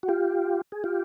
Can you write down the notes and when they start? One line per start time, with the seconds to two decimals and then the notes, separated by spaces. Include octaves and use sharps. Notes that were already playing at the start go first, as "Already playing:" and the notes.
0.03 F#4
0.09 F4 G4
0.72 G#4
0.84 F4 G4